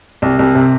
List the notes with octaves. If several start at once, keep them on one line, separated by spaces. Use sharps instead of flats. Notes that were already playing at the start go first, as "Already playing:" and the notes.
C2
C2
C3